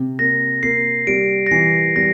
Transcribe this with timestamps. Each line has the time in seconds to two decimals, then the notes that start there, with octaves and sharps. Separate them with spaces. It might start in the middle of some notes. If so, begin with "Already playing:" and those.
Already playing: C3
0.19 A#3 A#6
0.63 A#3 C7
1.07 G3 D7
1.46 A#6
1.51 E3 C7
1.96 G3 A#6